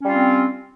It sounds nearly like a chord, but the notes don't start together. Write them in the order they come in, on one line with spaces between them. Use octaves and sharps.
C#4 G3 F4 C4